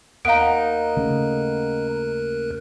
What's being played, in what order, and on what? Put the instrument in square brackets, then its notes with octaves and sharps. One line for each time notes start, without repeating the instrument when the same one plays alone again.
[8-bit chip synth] D#2 A#4 F#6 [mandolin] B3 D#4 [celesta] F5 D7
[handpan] C#3 A3